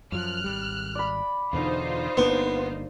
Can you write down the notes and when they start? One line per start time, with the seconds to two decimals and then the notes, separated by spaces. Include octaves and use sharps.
0.12 F#2 F3 F6 F#6
0.44 G#1 C#2 G3
0.95 D5 B5
1.53 E2 B2 D3 D#4 F4 C5
2.17 G1 A#3 B3 D4